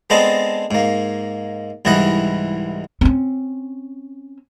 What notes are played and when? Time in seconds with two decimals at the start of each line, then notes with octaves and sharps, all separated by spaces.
0.10 G#3 B3 C4 D4 A4 D#5
0.71 G#2 A#3
1.85 C2 G#2 E3 E4 D#5 F#5
3.01 C4 C#4